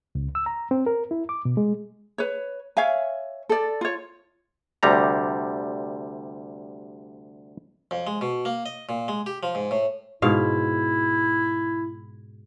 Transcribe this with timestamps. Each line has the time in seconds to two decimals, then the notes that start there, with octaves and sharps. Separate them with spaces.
0.15 C#2
0.35 E6
0.46 A#5
0.71 C4
0.86 A#4
1.11 E4
1.29 D6
1.45 B2
1.57 G#3
2.18 B4 C#5
2.77 C#5 E5 F5 G#5
3.49 A4 D5
3.81 F4 C#5
4.83 D2 C3 G3 A#5
7.91 F2
8.07 G#3
8.21 B2
8.45 A#3
8.66 D#5
8.89 A#2
9.08 G#3
9.26 G4
9.43 F3
9.55 G#2
9.71 A2
10.22 G#2 B2 E4 F5